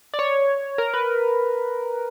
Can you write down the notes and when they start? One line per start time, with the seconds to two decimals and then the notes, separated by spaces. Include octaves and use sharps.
0.14 D5
0.19 C#5
0.78 A#4
0.94 B4